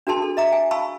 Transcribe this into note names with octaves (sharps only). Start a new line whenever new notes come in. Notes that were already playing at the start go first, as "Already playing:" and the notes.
D4 F#4 G#4 A#4 A5 C6
A4
D#5 E5 A#5 D6 D#6
G#5
F5 A5 B5 C#6 E6